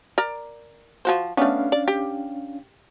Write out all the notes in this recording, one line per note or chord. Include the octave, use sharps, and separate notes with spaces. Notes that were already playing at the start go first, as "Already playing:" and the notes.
A#4 D5 A#5
F3 F#4 C5
A3 B3 C#4 D4 F5
D5
G4